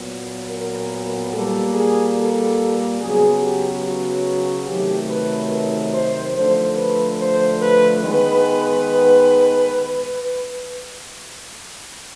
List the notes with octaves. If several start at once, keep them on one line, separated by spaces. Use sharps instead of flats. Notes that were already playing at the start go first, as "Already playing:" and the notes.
Already playing: A#2 F#3 B3
A#4
A#2 G3 A#3 A4
G#4
A4
C#3 F#3 B3 G#4
G4
F#4
C3 D#3 F#3 A3 G4
B4
A#4
C5
D3 F3 A3 C5
B4
C5
B4
D#3 G#3 B3 B4